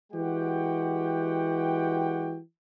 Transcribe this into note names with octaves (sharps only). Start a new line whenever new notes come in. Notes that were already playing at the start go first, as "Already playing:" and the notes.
E3 G#3 F#4 G4 F#5 G5